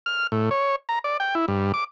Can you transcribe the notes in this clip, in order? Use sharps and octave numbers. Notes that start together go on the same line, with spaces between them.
F6
A2
C#5
A#5
D5
G5
E4
G2
D6